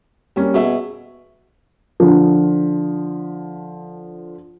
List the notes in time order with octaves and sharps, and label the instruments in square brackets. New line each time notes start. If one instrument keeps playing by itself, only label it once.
[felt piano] G3 A#3 C#4
[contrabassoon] B2 [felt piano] G#4 E5
[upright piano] D3 F3